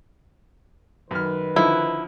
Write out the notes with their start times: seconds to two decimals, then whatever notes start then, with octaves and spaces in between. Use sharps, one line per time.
1.11 F#2 D#3 B4 F6
1.56 D3 F3 D#4 E4